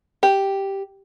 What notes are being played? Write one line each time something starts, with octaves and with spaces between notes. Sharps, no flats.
G4